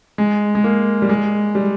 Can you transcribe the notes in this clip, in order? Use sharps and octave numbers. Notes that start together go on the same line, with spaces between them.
G#3
G#3
A#3
G3
G#3
G3